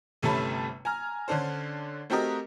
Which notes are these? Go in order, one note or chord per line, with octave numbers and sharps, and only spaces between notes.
G1 C3 A3 C#4 A5 B5
G#5 A#5 F6
D3 C#4 D4 A4 C5
A3 C4 F#4 G4 A#4 D#5